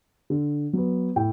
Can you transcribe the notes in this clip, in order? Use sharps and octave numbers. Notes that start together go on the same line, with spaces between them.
D3
F#3 B3
A2 G5